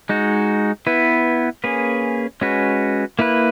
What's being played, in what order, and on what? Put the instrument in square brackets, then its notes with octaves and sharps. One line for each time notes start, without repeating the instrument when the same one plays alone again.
[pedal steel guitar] G#3 D#4 F#4
B3 E4 B4
A#3 C#4 G#4 B4
G#3 C#4 F#4 B4
A#3 E4 B4